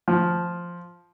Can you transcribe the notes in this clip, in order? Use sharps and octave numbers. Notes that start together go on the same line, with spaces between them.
F3